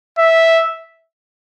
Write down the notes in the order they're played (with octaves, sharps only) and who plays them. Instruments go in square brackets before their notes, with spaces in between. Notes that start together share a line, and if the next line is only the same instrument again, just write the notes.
[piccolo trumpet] E5